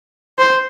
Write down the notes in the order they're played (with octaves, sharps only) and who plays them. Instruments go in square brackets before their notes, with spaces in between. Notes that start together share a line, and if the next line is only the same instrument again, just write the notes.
[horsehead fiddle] C5